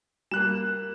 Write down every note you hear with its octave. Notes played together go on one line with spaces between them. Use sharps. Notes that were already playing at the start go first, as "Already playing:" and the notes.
G3 A#3 F#6 E7